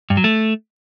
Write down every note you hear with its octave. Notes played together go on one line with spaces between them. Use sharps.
G2
F#3
A3